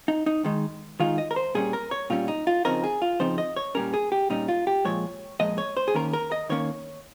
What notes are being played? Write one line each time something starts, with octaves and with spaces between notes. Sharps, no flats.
D#4
D#4
D#3 G#3 D#4
D#3 G#3 D#4 F4
D#5
A#4
C5
A#2 G3 C#4 G#4
A#4
C#5
A#2 G3 C#4 F4
D#4
F4
C#3 F3 C4 D#4 A#4
G#4
F4
C#3 F3 C4 D#4 C5
D#5
C#5
A#2 G3 C#4 A#4
G#4
G4
A#2 G3 C#4 D#4
F4
G4
A#2 F3 G#3 C#5
A#2 F3 G#3 D#5
C#5
C5
G#4
D#3 A#3 C#4 A#4
A#4
D#5
D#3 A#3 C#4 C#5